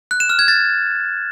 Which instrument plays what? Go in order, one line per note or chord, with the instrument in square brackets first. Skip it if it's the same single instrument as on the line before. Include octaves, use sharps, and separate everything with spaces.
[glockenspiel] F#6
E7
F6
G#6
A6